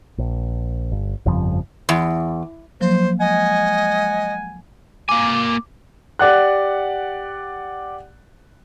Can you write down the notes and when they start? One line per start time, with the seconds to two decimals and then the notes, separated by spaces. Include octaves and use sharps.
0.18 A#1
0.92 G1
1.26 G1 F2 C#3 F3
1.89 E2
2.81 F3 F#3 A#3 C5
3.20 G#3 D#5 F#5 G#5
5.09 A#3 G#5 D6
6.19 G4 D5 F#5 F#6